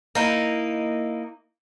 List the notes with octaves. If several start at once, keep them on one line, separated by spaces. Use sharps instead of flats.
A#3 D#4 E4